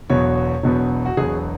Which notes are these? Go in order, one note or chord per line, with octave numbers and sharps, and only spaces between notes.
E1 E2 B2 F#3 B3 C#5
E1 E2 B2 F#3 B3
F#4
E1 E2 B2 F#3 B3 G#4